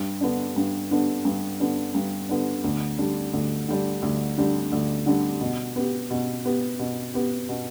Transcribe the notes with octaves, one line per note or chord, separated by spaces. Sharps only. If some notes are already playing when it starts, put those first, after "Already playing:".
Already playing: G2
D3 B3 D4
G2
D3 B3 D4
G2
D3 B3 D4
G2
D3 B3 D4
D2
D3 G3 D4
D2
D3 G3 D4
D2
D3 G3 D4
D2
D3 G3 D4
B2
B3 G4
B2
B3 G4
B2
B3 G4
B2